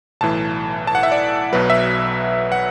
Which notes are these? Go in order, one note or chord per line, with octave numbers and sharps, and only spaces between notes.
B1 A2 E3 A5
A5
F#5
E5
D5
B1 B2 F#3 B4
E5
F#5